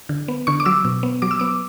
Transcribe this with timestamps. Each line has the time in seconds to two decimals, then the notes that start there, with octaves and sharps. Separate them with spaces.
0.09 D3
0.28 B3
0.47 D3 C#6
0.60 D6
0.66 F#3 E6
0.85 B2
1.03 B3
1.22 F#3 D6
1.31 E6
1.40 B3 D6